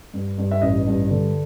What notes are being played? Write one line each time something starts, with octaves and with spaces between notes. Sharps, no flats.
G2
G2
E5
A1 D#5
G2
D3